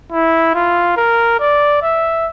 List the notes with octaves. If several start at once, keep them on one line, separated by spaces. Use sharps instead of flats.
E4
F4
A#4
D5
E5